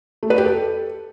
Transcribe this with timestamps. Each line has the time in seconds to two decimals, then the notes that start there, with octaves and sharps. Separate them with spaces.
0.23 A3
0.30 B4
0.38 G4
0.45 A4